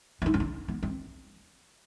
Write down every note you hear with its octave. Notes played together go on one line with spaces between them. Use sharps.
D4
D#4
C#4
D4
B3
C4